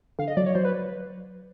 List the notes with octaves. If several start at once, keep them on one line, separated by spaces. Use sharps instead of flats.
D3 F5
D#5
F#3 D5
C#5
F#3 C5
B4